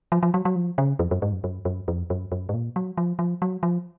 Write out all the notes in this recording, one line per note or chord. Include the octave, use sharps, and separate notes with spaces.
F3
F3
F#3
F#3
F3
C#3
F2
F#2
G#2
F#2
F#2
F#2
F2
F#2
F#2
G#2
A#2
F#3
F3
F3
F#3
F3